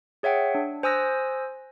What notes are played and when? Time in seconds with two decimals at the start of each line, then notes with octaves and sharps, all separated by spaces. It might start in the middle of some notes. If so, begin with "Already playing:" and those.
0.23 G#4 C#5 E5 F#5 G5
0.55 D4
0.83 C5 G#5 D#6 E6 F#6 A#6